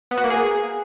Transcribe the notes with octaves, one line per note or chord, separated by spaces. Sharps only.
B3
F#4
A#3
G#4